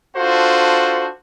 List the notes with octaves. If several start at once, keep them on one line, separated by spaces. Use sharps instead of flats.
D4 F4 F#4 A4 C5